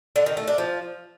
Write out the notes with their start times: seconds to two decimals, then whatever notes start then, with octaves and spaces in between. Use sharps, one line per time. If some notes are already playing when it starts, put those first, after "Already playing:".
0.16 D3
0.26 D#3
0.37 A3
0.48 D4
0.58 F3